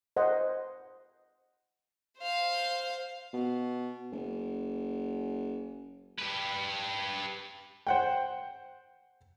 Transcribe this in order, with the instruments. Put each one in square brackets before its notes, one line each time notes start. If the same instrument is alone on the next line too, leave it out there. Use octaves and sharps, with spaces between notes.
[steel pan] C5 D#5 F#5
[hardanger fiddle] C5 F5
[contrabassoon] B2
F#1
[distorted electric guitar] G4 B4
[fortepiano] C5 F#5 G5